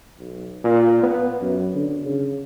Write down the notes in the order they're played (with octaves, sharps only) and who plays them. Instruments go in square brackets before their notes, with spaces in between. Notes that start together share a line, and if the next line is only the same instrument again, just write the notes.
[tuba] B1
A#2
B3
F#2
D3
C#3